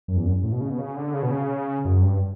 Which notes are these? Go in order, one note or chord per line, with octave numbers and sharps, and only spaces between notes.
F#2
E2
F#2
A2
B2
C#3
B2
C#3
D3
C#3
B2
C#3
F#2
G2